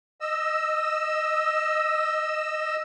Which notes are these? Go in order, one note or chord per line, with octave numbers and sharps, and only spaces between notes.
D#5 E6